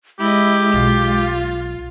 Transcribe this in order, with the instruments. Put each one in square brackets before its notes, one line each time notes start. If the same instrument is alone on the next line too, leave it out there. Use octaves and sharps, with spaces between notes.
[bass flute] G#3 [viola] E4 D#5 [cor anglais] G4
[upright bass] B1 [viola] F4